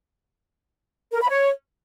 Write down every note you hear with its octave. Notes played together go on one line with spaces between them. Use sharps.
A#4
B5
C#5